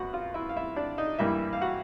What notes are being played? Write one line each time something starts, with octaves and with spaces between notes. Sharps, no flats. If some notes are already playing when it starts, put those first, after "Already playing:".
Already playing: F#2 B3 F#4 F#5
F4 F5
E4 E5
F5
E4 E5
D4 D5
D#4 D#5
G2 E3 G3 A#3 E4 E5
F5
F#4 F#5